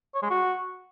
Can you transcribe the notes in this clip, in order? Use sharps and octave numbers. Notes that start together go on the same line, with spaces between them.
C#5
G#3
F#4